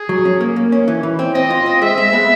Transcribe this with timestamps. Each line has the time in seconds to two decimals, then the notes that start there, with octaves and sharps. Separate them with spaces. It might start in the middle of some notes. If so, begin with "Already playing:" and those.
Already playing: G#4
0.09 F#3
0.25 C#4
0.41 A#3
0.56 A#3
0.72 C#4
0.88 E3
1.03 E3
1.19 C4
1.35 C4 D#5
1.50 F4
1.66 C4
1.82 G#3 E5
1.98 G#3
2.13 B3